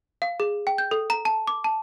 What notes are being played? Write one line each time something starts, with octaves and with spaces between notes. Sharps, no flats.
F5
G#4
G5
G6
A4
A#5
A5
D6
A5